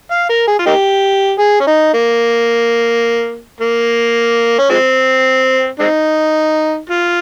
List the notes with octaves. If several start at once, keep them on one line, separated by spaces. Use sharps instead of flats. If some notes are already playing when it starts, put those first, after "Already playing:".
F5
A#4
G#4
F4
A#3 D#4 G4
G#4
C#4
D#4
A#3
A#3
C#4
F3 G#3 C4
G#3 C4 D#4
F4